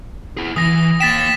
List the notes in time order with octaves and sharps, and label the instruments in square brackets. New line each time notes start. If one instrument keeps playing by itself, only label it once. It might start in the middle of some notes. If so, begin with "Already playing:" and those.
[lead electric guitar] E4 G#4
[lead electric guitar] E3 [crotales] D#6 A#6
[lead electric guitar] A#3 G5 [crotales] A6 B6 E7